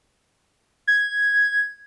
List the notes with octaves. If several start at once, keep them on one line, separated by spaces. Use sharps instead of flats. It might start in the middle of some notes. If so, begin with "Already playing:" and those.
G#6